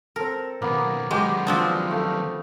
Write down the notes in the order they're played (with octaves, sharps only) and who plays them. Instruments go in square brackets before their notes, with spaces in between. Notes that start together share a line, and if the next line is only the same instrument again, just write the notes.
[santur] C4 A4 [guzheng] A#4
[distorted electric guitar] B2 D#3 [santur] A#3 B3
[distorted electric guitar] D#3 F#3 [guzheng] G#3 [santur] F#4 G4 D6
[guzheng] F3 C4 D4 [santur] D#5 F5
[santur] A3 F5